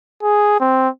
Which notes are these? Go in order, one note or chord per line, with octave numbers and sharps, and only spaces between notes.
G#4
C4